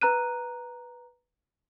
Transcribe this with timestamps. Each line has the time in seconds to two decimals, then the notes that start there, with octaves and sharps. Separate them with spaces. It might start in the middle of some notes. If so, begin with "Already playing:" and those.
0.01 B4 A#5 F#6 D#7